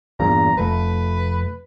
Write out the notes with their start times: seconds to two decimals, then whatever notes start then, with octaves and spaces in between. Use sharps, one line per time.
0.20 E2 G2 A#2 A#5
0.57 F1 A3 B4